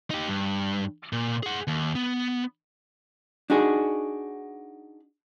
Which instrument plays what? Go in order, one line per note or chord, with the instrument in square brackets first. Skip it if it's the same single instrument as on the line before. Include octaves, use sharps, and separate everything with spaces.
[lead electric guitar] D#4 G4
G2
A#2
G#4 F#5
D#2
B3
[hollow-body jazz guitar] D4 D#4 F#4 G#4